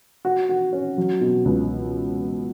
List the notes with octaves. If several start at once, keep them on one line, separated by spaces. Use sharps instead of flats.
F#4
F#4
C#4
F#3
B2
C#2